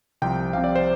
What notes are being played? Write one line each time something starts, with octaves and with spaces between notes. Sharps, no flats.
C2 C3 F3 C4 G5
C2 C3 F3 C4 F5
D5
C5